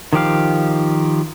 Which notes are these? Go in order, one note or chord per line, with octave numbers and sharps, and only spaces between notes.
D#3 F3 G4 F5